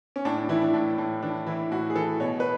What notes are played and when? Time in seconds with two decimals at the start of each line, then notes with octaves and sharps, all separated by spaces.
0.16 C#4
0.25 A2 D4
0.37 D4
0.49 E3 E4
0.62 D4
0.74 A2 D4
0.98 A2
1.22 E3 D4
1.47 E3 E4
1.71 A2 F#4
1.90 G#4
1.95 E3 A4
2.20 B2 C#5
2.40 B4